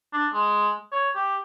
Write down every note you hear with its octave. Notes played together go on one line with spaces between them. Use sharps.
D4
G#3
C#5
G4